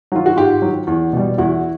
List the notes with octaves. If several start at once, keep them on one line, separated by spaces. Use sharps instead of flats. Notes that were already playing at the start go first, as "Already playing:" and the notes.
D#3 F#3 F4
F#4
G#2 F4 G4
D#3 F#3
E2
B2 G3
E2 E4 F#4